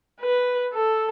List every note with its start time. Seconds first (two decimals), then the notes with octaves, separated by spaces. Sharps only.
0.21 B4
0.74 A4